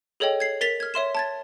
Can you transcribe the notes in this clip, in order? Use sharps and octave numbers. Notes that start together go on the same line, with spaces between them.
G#4 A4 C#5 D#5 G5
G#6 C7
A#4 A6 B6 F7
F6 G#6
C#5 E5 C6 E7
A5 G#6 A6